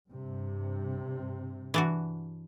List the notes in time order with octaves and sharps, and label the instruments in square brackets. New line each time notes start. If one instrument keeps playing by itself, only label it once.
[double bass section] G2 C3
[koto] E3 D4 F#4